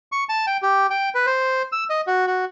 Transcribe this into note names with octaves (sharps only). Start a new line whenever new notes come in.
C#6
A5
G5
G4
G5
B4
C5
E6
D#5
F#4
F#4